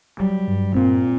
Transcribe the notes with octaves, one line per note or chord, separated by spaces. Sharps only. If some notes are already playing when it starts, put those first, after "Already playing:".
F#3 G3
G2
A#2 C4